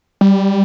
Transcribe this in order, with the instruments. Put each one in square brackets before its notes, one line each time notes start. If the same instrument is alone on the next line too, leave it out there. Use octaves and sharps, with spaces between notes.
[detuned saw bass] G3